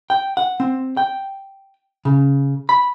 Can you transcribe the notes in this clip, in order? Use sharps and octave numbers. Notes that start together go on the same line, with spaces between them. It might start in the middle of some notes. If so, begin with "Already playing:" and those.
G5
F#5
C4
G5
C#3
B5